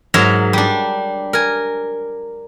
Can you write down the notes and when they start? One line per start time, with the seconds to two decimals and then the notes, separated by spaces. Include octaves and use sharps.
0.14 G#2 F#3 A#4 E5 A#5
0.53 G3 D4
1.33 A#4 G#5